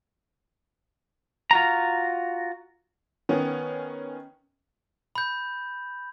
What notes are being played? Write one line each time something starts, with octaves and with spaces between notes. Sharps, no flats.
F4 F#4 A#5
D#3 B3 C#4
B5 G6